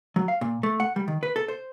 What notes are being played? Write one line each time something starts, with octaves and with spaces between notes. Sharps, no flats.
F#3
F5
A#2
A3
F#5
G3
D#3
B4
A4
C5